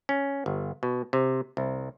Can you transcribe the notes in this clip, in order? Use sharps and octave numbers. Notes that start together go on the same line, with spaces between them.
C#4
G1
B2
C3
C2